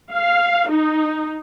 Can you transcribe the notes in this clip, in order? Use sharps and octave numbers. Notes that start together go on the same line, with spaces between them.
F5
D#4